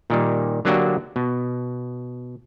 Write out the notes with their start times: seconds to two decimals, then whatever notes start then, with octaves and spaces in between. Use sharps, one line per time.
0.10 A#2 D#3 G3
0.65 D3 F#3 A#3 D4 F#4 G4
1.16 B2